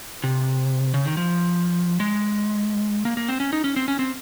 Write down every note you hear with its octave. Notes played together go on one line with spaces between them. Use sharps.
C3
C#3
D#3
F3
G#3
A#3
A#3
C4
C#4
D#4
C#4
C4
C#4
C4